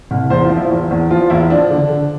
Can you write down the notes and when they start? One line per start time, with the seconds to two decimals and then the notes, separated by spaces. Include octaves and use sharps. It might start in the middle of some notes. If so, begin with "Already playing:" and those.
0.11 C2
0.30 E2 C5
0.44 F4
0.50 F3
0.57 E4
0.71 E2
0.91 E2
1.10 F3 F4
1.30 E2 E4
1.50 F3 D4
1.70 D3
1.90 D3